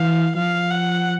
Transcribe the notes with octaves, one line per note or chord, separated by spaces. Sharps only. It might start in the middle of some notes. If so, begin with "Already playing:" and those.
Already playing: E3 F5
F3 F5
F#5